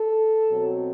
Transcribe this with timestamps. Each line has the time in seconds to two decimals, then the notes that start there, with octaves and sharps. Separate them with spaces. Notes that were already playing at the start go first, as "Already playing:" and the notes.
Already playing: A4
0.49 B2 F#3 C4